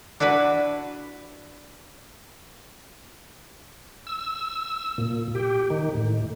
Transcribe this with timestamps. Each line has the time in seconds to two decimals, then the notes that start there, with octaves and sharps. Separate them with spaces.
0.20 D4 E4 F#4 B4
4.07 E6
4.98 A#2
5.35 G4
5.70 D#3
5.94 A2